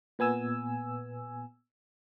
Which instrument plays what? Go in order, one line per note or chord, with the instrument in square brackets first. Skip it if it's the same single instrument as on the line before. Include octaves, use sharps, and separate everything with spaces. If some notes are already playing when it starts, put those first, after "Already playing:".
[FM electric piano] A#2 B3 G#5 E6